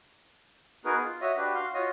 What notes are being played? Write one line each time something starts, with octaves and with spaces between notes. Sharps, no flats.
B3 D#4 F#4 G#4 A#4 B4
F4
F#4 C#5 D#5 E5
D4 F#4 G4 B4
F#4 F5 C6
F4 F#4 C#5 D#5